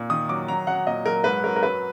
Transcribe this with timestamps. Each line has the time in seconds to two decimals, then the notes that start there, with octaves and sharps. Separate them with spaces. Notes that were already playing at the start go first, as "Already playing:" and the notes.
Already playing: A#2
0.10 D#3 D#6
0.29 F#3 D6
0.48 F#3 A#5
0.67 F#3 F#5
0.87 A#2 D#5
1.06 F#3 A#4
1.24 G#2 B4
1.44 F#3 A#4
1.56 A#4
1.62 F#2 B4